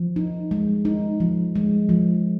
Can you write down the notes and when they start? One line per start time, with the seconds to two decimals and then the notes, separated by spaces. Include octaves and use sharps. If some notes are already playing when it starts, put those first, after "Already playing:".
Already playing: F3
0.16 D#4
0.51 G#3
0.85 D#4
1.20 F3
1.56 G#3
1.89 F3